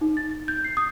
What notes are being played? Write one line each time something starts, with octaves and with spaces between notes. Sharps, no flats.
D#4
A6
G6
C7
D#6